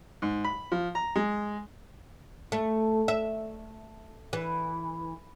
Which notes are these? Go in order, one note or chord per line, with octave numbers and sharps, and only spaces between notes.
G#2
B5
F3
A#5
G#3
A3
E5
E3